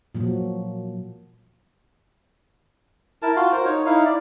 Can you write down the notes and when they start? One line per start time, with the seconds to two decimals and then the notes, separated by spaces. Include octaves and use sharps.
0.15 A#2 F3 F#3
3.22 E4 A#4 A5
3.36 F4 F#4 F5
3.52 A#4 C5
3.65 D#4 C#5
3.86 D#4 E4 F5
4.05 D5